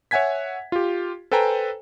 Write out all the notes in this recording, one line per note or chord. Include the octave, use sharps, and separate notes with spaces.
C#5 E5 F#5 G#5 G#6 B6
F4 G4
A4 B4 C5 G5 G#5 A#5